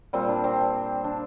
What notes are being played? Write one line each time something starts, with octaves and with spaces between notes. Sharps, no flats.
A#2 G3 C4
D4
C4
D4